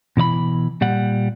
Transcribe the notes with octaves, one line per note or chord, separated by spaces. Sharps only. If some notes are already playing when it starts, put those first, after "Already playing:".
B2 E3 D5 B5
A#2 G3 F#5